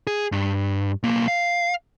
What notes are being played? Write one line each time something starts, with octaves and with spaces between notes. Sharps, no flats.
G#4
G2
B1 A#3
F5